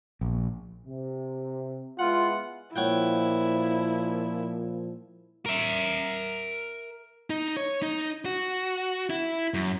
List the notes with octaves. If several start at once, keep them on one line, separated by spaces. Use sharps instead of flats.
A#1
C3
G#3 B3 E4 F4 F#5
A#2 F3 E4 C#5 F#5 G5
A#4 E5
D#4
C#5
D#4
F#4
E4
F#2